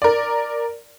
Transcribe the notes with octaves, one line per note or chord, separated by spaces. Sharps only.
A#4 D5